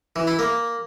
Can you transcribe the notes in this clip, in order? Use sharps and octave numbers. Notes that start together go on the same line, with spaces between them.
E3
E4
A#3